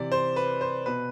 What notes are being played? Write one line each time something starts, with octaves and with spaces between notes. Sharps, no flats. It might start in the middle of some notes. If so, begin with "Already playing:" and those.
Already playing: C3 E3 D5
C5
B4
C5
B2 B4